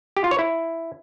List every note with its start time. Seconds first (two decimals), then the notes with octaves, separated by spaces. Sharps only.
0.17 G4
0.24 F4
0.31 C#5
0.39 E4